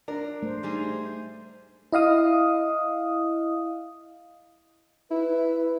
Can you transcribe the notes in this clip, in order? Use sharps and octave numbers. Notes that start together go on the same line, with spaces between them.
D4 A#4
A3 C5
G3 D#4 G#4
E4 D#5 F5 D#6
E4 B4